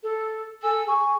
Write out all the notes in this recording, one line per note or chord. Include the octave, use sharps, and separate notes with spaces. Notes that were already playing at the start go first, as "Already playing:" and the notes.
A4
A4 G#5 E6
G#4 G#5 C#6